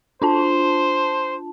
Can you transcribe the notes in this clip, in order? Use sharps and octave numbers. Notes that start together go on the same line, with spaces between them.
D4 F4 C5 A5